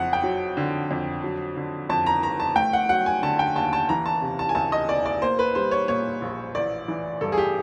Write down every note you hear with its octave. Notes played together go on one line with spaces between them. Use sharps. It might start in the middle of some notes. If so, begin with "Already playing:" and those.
Already playing: F#1 F2 F#5
G5
F#3
D3
F2
F#3
D3
F2 A5
A#5
G1 A#5
A5
A3 G5
F#5
F#3 F#5
G#5
D3 A5
G5
D#2 A5
A5
E3 A#5
A5
C3
A5
G#5
D2 A5
D#5
E1 D5
D5
A#3 C5
B4
G3 C5
C#5
A#2 C#5
A#1
A1 D5
E3
G2 A4
G#4
G4